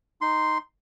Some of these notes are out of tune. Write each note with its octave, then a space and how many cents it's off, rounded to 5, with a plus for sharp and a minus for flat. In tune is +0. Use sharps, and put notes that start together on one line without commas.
D#4 +0 C6 -5